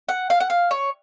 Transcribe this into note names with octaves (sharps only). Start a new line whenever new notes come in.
F#5
F5
F#5
F5
C#5